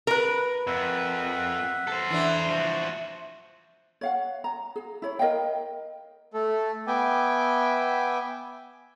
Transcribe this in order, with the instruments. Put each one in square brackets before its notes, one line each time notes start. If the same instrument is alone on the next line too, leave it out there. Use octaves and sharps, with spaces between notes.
[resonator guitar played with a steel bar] A#4 B4
[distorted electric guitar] F2 [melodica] E5 F#5
[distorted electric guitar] A4 C5
[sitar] E3 D4
[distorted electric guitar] F3 F#4 [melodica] C5 A5
[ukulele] C#5 F5 F#5
A#5
G#4
E4 C#5
A#4 D#5 F5 G5
[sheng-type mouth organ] A3 A4
B3 E5 G5 G#5 D6